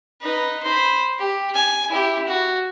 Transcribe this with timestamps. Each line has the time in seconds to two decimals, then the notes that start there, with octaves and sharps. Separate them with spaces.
0.21 D#4 B4
0.63 C5 B5
1.19 G4
1.54 G#5
1.89 E4 G4
2.27 F#4